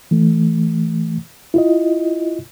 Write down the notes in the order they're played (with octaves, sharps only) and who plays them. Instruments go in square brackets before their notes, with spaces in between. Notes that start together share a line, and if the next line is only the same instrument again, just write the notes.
[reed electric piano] E3 A3
E4 F4 D#5